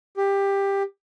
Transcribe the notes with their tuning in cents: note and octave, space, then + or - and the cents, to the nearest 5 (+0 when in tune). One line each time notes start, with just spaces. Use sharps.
G4 +15